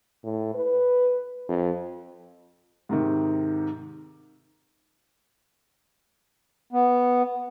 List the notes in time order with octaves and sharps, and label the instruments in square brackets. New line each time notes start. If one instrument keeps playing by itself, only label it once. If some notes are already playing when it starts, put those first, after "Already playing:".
[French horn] A2
B4
F2
[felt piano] G#2 C3 D#3
[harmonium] B3